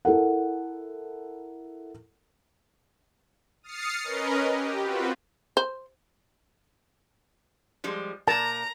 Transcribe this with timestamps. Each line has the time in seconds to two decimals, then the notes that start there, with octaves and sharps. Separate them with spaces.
0.05 E4 A4 A#4 F#5
3.63 D#6 F6 A6 C7 C#7
4.04 C#4 A#4 B4 D#5
4.50 G4
4.82 C4 F4 F#4 B4
5.57 C5
7.84 F3 G3 G#3
8.28 A#2 A#4 A5 A#5